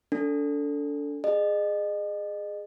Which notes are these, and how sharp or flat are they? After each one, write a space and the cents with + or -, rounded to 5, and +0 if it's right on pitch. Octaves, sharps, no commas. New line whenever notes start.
D4 -35 A4 +10
G#4 +0 D#5 -35